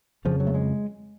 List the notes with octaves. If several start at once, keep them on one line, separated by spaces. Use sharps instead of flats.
F2 C#3 F3
F#3
A3
G#3